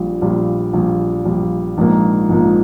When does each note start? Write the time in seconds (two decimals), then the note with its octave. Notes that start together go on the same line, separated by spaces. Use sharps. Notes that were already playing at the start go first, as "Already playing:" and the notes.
Already playing: A#1 A#2 G3
0.22 A#1 A#2 G3
0.73 A#1 A#2 G3
1.25 A#1 A#2 G3
1.78 A#1 G#2 F3 A#3
2.29 A#1 G#2 F3 A#3